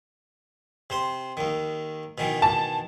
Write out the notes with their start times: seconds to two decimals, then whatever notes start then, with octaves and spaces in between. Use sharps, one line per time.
0.90 C3 C5 C6
1.37 D#2 D#3
2.18 B2 D#3 E3
2.42 A5